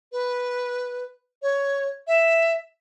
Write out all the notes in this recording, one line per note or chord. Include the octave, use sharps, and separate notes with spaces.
B4
C#5
E5